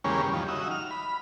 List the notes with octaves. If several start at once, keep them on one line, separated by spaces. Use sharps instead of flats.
E2 C#3 G3 G#3 A#3 C#4
G2
D#2 F3 G3
D#4 F#4 E5
F6
B5